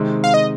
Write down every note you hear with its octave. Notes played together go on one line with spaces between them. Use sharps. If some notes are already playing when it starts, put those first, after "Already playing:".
Already playing: C3 D#3 G#3 C4 D#4
F5
D#5